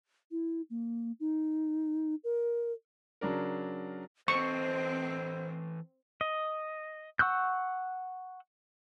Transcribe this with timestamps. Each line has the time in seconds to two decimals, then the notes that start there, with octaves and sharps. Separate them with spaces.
0.31 E4
0.70 A#3
1.20 D#4
2.24 A#4
3.21 C#3 F#3 D4 A#4
4.28 E3 C4 A4 C5 D#5 C#6
6.21 D#5
7.19 F#5 C#6 E6 F#6 G6